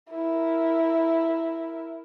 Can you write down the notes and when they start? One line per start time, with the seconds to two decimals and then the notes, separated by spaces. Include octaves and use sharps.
0.11 E4 A#4